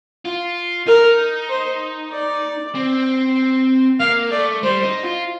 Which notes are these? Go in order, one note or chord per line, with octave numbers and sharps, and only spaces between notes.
F4
D#4 A#4
C5
D5
C4
A#3 F5
A3 D5
G3 C5
D#4
F4